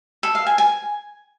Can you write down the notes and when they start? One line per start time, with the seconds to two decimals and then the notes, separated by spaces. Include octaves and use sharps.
0.23 A4
0.35 F5
0.46 G#5
0.58 G#5